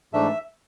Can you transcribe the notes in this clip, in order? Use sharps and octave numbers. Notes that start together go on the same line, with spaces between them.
G#2 E3 A3 D4 E5